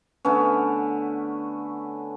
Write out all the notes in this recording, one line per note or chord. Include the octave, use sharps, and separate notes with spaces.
D3 A3 B3 C#4